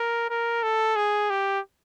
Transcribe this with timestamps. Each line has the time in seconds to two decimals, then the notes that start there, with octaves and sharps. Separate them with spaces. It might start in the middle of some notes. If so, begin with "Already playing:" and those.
Already playing: A#4
0.30 A#4
0.63 A4
0.96 G#4
1.30 G4